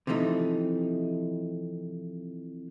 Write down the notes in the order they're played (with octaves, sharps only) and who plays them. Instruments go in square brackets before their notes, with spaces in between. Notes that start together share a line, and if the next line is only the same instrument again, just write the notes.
[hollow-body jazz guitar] C3 E3 F3 A3 D#4